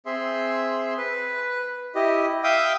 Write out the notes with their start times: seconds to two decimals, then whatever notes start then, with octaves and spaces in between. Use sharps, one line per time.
0.06 C4 G#4 E5 C6
0.98 B4
1.95 E4 G4 D#5
2.44 E5 F5 G5 D#6